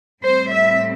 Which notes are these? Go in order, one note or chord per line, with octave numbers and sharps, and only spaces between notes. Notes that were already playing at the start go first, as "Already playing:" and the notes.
A2 G3 C4 C5
E5